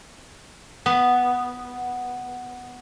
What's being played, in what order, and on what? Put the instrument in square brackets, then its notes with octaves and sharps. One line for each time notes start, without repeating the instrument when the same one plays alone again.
[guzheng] B3 [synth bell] F#5